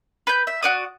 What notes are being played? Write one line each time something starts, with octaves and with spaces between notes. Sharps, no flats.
B4 G6
E5
F#4 D5 D#6